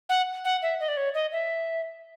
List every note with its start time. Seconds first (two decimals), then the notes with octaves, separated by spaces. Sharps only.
0.09 F#5
0.45 F#5
0.62 E5
0.80 D#5
0.88 D5
0.97 C#5
1.14 D#5
1.32 E5